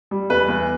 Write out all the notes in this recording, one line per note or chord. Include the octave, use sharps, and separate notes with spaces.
G3
E2 B4
E2